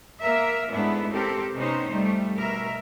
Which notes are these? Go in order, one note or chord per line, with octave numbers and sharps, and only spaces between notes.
A#3 A#4 E5
G#2 A3 B3 D4 E4
C4 G4 A4 A#4
C3 B3 C#4 D#4 C5
F2 G3 A3
B2 A#4 E5